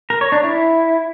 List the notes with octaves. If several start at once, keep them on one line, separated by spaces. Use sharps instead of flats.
A#4
C#5
D4
E4